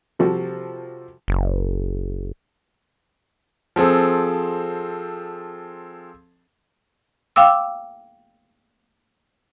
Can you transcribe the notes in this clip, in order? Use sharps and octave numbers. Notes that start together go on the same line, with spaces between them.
C3 F3 G3 F#4 A4
F#1
F3 C4 G#4 A4
F5 G5 D6 E6